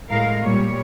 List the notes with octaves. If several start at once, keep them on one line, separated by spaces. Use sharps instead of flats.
A2 G#3 A#4 F5
A#2 G3 C#5